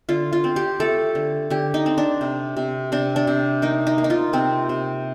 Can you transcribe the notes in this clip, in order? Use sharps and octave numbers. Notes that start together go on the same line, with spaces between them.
D3 F4
F4
C4
G4
A3 A4
D3
D3 G4
D#4
C4
D4
C3
C3
C3 D4
D4
C3
A#3 D#4
D#4
A#3
D#4
F4
C3 C4
C3